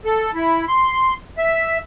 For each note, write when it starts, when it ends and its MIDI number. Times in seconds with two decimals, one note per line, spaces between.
0.05 0.31 69
0.35 0.65 64
0.68 1.14 84
1.38 1.78 76